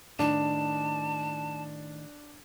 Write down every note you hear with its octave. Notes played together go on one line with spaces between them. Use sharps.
A2 D#3 D4 A5